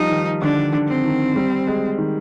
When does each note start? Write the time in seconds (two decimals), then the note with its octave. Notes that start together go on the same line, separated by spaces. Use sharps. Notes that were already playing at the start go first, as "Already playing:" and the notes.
Already playing: F3 G3 D#4
0.10 D#3
0.41 D3 D4
0.73 D3
0.88 C4
1.04 D#3
1.36 G3
1.67 G#3
1.98 D#3